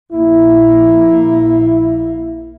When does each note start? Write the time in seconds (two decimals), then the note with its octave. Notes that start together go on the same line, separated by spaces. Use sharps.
0.12 A#1 A#3 E4